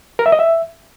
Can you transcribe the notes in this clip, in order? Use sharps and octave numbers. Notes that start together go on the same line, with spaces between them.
A#4
E5
D#5
E5